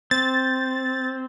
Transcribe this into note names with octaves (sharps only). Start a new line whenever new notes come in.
C4 A6